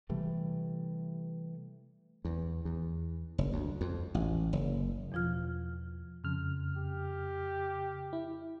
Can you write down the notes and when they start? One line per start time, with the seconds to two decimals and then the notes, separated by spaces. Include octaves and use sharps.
0.09 C3 E3 G3 A3
2.25 E2
2.65 E2
3.38 F#1
3.53 D2
3.81 F2
4.15 A1
4.53 F#1
5.12 E2 B2 F3 F4 F6
6.24 F2 C#3 F6
6.77 G4
8.13 E4